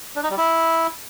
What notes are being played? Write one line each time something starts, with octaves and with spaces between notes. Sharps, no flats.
D4
D#4
G3
E4